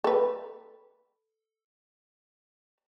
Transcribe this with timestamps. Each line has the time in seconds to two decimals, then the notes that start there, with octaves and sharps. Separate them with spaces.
0.04 A4 B4